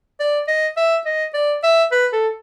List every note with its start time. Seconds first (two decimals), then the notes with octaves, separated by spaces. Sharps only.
0.20 D5
0.48 D#5
0.77 E5
1.05 D#5
1.34 D5
1.63 E5
1.92 B4
2.13 A4